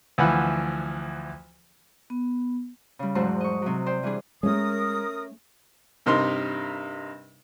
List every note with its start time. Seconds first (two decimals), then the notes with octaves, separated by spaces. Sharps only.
0.18 D2 E3 F3 F#5 B5
2.10 B3
2.99 C#3 G3
3.15 E2 G#2 F#3 C5 A5
3.41 D#5 C#6
3.62 C3 F#3
3.86 C5 D5 G5
4.03 E3 G3 D4 G#4
4.43 G#3 A3 C#4 A#4 D#6
6.06 G2 C3 D#4 A#4 C6